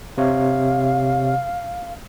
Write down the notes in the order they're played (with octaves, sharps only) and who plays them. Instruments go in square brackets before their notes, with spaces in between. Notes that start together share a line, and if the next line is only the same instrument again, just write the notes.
[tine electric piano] C3 C#5 [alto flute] F5